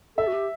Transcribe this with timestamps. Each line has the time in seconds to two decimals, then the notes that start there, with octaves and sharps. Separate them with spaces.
0.18 A4 E5
0.28 F#4
0.33 G4